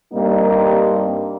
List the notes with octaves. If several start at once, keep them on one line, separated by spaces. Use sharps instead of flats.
G2 G3 A#3 C4 D#4